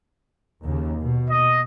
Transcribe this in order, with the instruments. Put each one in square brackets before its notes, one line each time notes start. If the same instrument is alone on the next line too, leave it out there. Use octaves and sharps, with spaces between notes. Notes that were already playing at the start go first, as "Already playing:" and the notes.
[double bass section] D#2 C#3
B2
[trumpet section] D#5